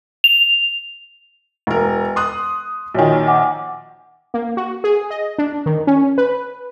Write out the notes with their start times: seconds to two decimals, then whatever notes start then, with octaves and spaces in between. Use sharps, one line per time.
0.24 F7
1.67 E1 A#4
2.16 C6 D#6 F#6
2.94 A#1 D#3 F#4 C#5 G#5
3.27 F#5 G#5 D6
4.34 A#3
4.57 F#4
4.84 G#4
5.10 D#5
5.38 D4
5.66 D#3
5.87 C#4
6.18 B4